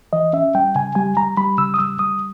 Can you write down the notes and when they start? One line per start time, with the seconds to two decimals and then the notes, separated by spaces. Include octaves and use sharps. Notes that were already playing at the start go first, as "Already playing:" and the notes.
0.13 E3 D#5
0.33 C#4 E5
0.55 G3 G5
0.75 C#3 G#5
0.95 G3 G#5
1.17 G3 A#5
1.37 G3 B5
1.58 C#3 E6
1.74 D#6
1.79 G3 E6
1.99 G3 D#6